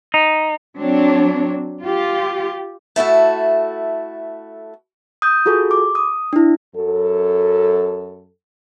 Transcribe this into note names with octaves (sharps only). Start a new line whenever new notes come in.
D#4
F#3 C4 D4 C#5
F4 G4
A3 E4 F#4 A4
D#6 G6
F4 F#4 G#4 A4
D6
D#6
D4 E4
F#2 A4